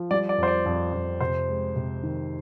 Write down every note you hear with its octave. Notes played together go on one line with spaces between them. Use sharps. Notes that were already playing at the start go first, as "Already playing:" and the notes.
Already playing: F3
G3 D5
D5
F2 C5
D5
F2
F2
C3 C5
G#3
C3
D#3